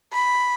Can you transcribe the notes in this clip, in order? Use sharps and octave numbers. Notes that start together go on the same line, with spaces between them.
B5